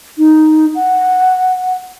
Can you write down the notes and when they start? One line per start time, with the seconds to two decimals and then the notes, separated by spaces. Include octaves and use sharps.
0.18 D#4
0.75 F#5